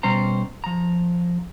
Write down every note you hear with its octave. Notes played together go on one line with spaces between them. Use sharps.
B2 G3 C#4 C5 A#5
F3 A#5